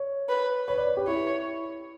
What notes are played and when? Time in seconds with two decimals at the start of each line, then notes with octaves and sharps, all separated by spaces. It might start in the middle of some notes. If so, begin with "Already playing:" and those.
Already playing: C#5
0.29 B4
0.68 B4 C#5
0.77 D5
0.87 C#5
0.97 G4
1.07 E4 C#5